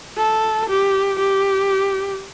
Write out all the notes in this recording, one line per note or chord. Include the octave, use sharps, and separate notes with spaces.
A4
G4
G4